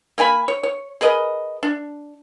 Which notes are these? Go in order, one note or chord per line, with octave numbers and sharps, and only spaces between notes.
A#3 A#4 G#5 B5
C#5
C#5
G#4 A#4 B4 D#5
D4